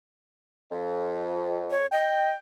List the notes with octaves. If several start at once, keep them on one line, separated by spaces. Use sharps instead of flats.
F2
C#5
D#5 G5